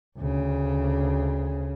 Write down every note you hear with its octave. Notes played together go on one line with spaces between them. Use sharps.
D2 C#3